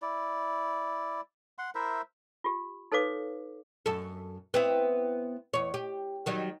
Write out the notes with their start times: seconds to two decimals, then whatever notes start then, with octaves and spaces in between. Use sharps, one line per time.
0.02 E4 D5
1.58 F#5 C6
1.75 E4 A#4 C5 E5
2.44 F4 G4
2.92 D#4 A4 B4 C#5 F5 D6
3.86 F#2 A4
4.54 B3 C4 E4
5.53 E2 C#5
5.74 G4
6.26 D#3 F#3 G3